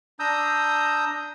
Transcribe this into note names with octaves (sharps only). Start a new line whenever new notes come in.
D4 A#5 D#6 E6 G6